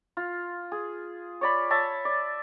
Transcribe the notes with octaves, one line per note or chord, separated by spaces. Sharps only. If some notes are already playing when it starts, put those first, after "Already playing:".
F4
G#4
C#5 D5 B5
C#5 E5 A5
D5